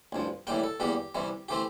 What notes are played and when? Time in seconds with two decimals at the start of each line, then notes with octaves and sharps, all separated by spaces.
0.12 A1 G2 F3
0.47 A2 E3 G3 A#3 G5
0.64 A4
0.80 E2 E3 G3 A#3 G4
1.15 C2 C3 E3 G3
1.49 E3 A3 C4 G4